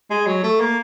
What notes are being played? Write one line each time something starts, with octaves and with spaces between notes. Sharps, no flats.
G#3
F#3
A3
A#3